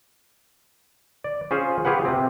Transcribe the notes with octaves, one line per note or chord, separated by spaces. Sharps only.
D5
C#4 F4 G#4 C5
F4 G4 G#4 B4 F#5
C3 C4